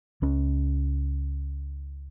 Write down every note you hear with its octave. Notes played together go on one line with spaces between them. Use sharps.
C#2 C#4